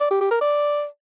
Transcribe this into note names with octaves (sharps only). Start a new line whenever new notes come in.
D5
G4
G4
A#4
D5